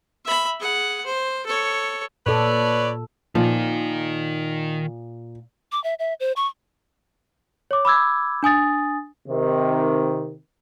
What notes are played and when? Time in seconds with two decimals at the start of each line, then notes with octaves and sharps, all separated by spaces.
0.25 E5 B5
0.60 G#4 F#5
1.05 C5
1.46 A4 C#5
2.26 A#2 A4 B4 C#5 D5
3.35 A#2 D#3 F3 D#4
5.72 D6
5.84 E5
5.99 E5
6.20 C5
6.36 C#6
7.71 C#5 D6
7.85 B5 D6 E6 G#6
8.43 D4 G#5 D#6 A6
9.28 C3 D#3